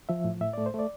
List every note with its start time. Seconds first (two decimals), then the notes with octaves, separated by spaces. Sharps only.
0.09 F3 E5
0.24 A2
0.41 A2 E5
0.53 A3 D5
0.66 C5
0.74 A3 D5